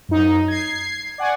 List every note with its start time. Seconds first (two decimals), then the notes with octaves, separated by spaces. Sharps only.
0.09 F#2 D#4
0.48 G#6 C7
1.18 D5 F#5 G#5 C#6